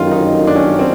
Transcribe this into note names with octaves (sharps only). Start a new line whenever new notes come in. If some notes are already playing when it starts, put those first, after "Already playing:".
Already playing: G1 F#2 D#3 F4
D#4
D4
C#4
C4